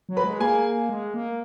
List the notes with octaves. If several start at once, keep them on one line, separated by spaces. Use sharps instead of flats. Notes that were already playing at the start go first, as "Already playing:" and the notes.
F#3
B4 B5
G#3
A#3 G#4 G#5
G#3
A#3